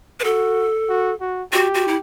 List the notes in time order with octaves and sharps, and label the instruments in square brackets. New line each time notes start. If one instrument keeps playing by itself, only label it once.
[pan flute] B4
[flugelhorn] F#4 [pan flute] A4
[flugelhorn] F#4
F#4
[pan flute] F#4 [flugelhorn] G4
[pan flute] F#4
E4